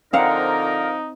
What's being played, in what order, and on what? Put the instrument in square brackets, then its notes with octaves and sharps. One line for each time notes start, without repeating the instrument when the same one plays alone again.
[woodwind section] D3 F3 A#4 [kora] C4 F5 F#5 [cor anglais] D#4